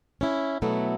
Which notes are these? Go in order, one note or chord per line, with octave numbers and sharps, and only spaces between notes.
C#4 E4
B2 F#3 A3 B3 E4